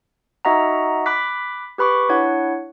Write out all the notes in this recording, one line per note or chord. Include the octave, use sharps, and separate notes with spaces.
D#4 F#4 D#5 E5 F#5 A#5
B5 D6 F#6 B6
G4 B4 B5 C#6 D6
D4 E4 C#5 F#5